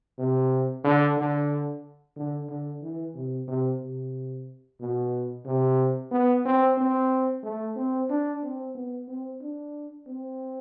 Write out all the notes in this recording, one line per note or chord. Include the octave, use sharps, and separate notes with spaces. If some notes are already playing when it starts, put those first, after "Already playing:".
C3
D3
D3
D3
D3
E3
C3
C3
C3
B2
C3
B3
C4
C4
A3
C4
D4
C4
B3
C4
D4
C4